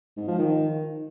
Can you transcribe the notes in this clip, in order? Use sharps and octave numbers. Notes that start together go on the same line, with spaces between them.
G#2
F3
D#3